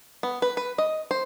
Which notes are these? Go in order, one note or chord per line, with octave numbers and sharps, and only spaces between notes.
B3
B4
B4
D#5
C5